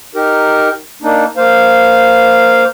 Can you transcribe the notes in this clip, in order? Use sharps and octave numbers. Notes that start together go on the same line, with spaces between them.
D#4 G4 A#4
A#3 D4 D#4
A#3 C5 F5